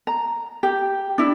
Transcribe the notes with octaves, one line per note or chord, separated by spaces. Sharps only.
A#5
G4
D4 E4